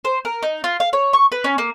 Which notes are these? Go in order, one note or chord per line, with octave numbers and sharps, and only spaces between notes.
C5
A#4
D#4
F4
F5
C#5
C#6
B4
C#4
A#3